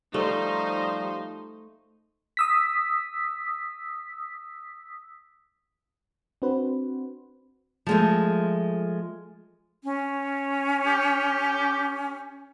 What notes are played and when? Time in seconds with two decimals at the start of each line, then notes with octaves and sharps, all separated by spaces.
0.14 F3 G3 A3 D#4 C5
2.37 D#6 E6 B6
6.42 C4 D4 F#4 B4 C5
7.87 F3 G#3 A3
9.84 C#4
10.86 G4